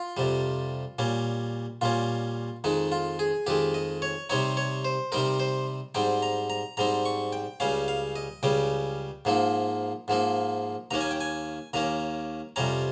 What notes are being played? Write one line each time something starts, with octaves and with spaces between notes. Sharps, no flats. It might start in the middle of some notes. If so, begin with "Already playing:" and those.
Already playing: F4
F2 C3 G3
A#2 G3 C#4
A#2 G3 C#4 F4
F2 D#3 G#3 D#4
F4
G#4
F2 D#3 G#3 G4
D#5
C#5
C3 G3 C4 D#4 C#5
C#5
C5
C3 G3 C4 D#4 A#4
C5
G#2 G3 C4 D#4 G5
A#5
A#5
G#2 G3 C4 D#4 A#5
C#6
G5
C#2 C#3 G3 C#4 F5
F5
D#5
C#2 C#3 G3 C#4 G5
G#2 F3 A#3 D#4
G#2 F3 A#3 D#4
D#2 D#3 A#3 C#4 A#5
G#5
G5
G#5
D#2 D#3 A#3 C#4 A#5
F2 C3 G3 C#4 A#5